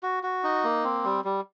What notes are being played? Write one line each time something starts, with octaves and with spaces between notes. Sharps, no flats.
F#4
F#4
D#4
A#3
C4
G3
G3